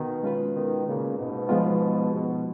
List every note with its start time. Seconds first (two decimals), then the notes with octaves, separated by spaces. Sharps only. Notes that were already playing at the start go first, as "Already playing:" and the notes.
Already playing: B2 D#3
0.23 G#3 C#4 F4 B4
0.54 B2 D#3
0.86 A#2 C#3
1.17 G#2 B2
1.49 F3 G#3 B3 F4
2.11 G#2 B2